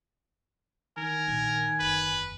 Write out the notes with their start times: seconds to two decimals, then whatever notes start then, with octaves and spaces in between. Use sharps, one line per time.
0.97 D#3 A#4 G#5
1.27 A#1 D#4
1.80 F#1 E2 B4